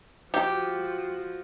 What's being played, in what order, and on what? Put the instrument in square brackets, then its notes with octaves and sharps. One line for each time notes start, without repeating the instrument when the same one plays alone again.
[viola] F3 F#4 [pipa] G4